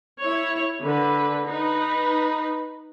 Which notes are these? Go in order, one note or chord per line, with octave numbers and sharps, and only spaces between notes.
E4 C#5
D3 B4
D#4 B4